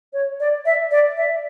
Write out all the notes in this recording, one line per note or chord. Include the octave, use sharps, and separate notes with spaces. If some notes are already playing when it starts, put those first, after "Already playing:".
C#5
D5
E5
D5
E5